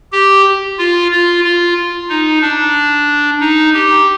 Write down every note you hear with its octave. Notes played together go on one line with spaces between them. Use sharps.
G4
F4
F4
F4
D#4
D4
D#4
G4